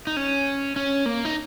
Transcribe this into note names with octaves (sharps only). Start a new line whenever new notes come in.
D#4
C#4
C#4
A#3
D#4